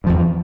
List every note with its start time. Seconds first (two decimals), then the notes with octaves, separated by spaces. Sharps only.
0.04 G2
0.07 F3
0.09 E2